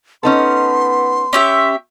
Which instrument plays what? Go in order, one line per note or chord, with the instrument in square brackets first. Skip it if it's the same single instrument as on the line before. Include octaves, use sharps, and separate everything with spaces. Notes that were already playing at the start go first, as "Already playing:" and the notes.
[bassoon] B3 [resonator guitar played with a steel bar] C#4 D#4 A4 [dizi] C6
[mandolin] C#4 G4 E5